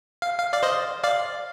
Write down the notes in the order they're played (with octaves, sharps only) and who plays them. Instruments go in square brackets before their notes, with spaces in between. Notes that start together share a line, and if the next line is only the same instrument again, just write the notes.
[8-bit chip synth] F5
F5
D5 F5
C5 D#5
D5 F5